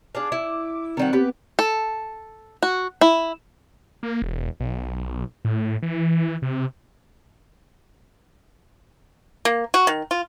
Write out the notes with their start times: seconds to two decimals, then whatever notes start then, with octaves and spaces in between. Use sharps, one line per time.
0.15 D4 G#4 F5 D6
0.32 E4
0.97 D#3 G3 C4 F#5
1.13 B3 G4 B4
1.59 A4
2.63 F#4
3.01 E4
4.03 A#3
4.22 E1
4.60 B1
5.45 A2
5.82 E3
6.42 C3
9.45 A#3
9.74 F#4
9.87 D#3
10.11 F4